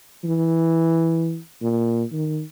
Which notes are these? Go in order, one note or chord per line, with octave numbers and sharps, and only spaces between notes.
E3
A#2
D#3